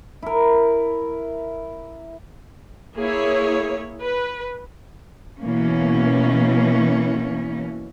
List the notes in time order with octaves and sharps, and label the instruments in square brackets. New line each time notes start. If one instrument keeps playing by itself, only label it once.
[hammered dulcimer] E4 A#4
[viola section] A#3 E4 G#4 C#5
B4
[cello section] B2 E3 A#3 C#4